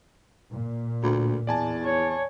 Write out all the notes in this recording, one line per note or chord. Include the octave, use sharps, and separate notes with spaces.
A#2
D2
E2 D5 G#5 A5
C#5